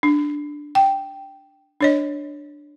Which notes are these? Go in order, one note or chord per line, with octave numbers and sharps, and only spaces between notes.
D4
G5
D4 C#5 D#5